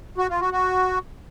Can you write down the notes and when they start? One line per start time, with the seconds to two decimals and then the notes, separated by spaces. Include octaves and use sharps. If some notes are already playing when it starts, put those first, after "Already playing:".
0.18 F#4
0.29 F4
0.40 F#4
0.52 F#4